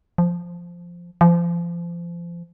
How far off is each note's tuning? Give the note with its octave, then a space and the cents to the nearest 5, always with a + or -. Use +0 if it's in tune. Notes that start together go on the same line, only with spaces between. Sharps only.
F3 -5
F3 -30